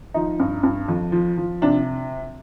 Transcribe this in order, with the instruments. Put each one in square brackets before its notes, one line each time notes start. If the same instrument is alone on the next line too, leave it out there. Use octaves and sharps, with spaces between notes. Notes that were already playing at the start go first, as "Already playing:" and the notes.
[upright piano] F3 D#4
G2
G2
F2
F3
F3
C3 D4